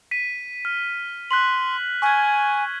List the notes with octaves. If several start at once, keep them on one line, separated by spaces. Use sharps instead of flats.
B6 D#7
F6
C6 F#6 B6 F#7
G#5 C#6 F6 G#6